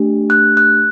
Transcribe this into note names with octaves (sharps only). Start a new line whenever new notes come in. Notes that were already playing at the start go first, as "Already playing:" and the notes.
Already playing: A3 D4 G4
F#6
F#6